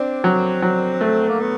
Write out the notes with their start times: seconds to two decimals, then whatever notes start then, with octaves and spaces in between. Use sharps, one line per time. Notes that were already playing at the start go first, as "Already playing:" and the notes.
Already playing: C4 D4
0.24 F#3
0.62 F#3
1.01 A3
1.29 A#3
1.40 B3